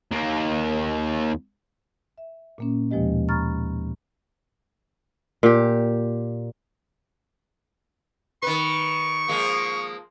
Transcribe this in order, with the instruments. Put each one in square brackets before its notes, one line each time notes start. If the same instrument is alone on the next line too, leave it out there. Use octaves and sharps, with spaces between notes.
[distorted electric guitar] D#2 A#3
[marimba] E5
A#2 A#3 C#4
D#2 B2 F3 G#3 G4 D#5
A#5 B5 C#6 F6 A6
[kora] A#2 G4
[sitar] D#3 B4 [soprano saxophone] C#6
[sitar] F3 G#3 A#3